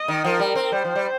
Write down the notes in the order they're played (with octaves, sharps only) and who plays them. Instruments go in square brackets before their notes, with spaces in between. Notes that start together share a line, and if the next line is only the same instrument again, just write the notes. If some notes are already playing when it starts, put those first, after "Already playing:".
Already playing: [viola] D#5
[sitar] D#3
[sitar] F3 [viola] A#4
[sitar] G3
C4
[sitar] G3 [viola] C5
[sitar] F3
G3